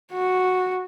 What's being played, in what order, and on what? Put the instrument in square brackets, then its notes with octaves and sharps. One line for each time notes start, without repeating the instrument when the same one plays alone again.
[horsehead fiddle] F#4